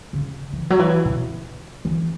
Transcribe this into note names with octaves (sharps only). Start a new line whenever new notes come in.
C#3
E3
F#3
E3
B2
E3